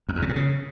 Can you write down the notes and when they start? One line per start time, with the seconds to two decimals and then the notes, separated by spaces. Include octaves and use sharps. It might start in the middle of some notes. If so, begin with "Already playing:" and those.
0.09 F2
0.15 E2
0.22 C3
0.29 A2
0.36 C#3